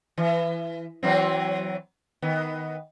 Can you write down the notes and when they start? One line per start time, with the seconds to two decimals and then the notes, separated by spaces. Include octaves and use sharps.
0.17 E3
1.03 E3 F#3 C4
2.22 D#3 B3